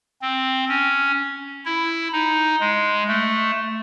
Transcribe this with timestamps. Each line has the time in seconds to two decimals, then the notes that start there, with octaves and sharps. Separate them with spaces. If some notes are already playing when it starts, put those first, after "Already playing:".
0.21 C4
0.69 C#4
1.65 E4
2.12 D#4
2.60 G#3
3.08 A3